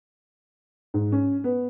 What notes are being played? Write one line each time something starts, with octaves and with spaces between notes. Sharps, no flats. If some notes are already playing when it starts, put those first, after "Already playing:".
G#2
C#4
B3